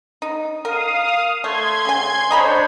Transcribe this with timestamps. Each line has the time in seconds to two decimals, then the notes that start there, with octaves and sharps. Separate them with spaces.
0.22 D#4
0.65 A#4 F5 D#6
1.44 A3 C6 G#6
1.85 C#3 G#5
2.30 D4 C5 C#5 D#5 A#5 B5